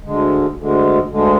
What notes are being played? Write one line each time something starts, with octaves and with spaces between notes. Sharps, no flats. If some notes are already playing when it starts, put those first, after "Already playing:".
D2 D3 G#3
D2 D3 G#3
D2 D3 G#3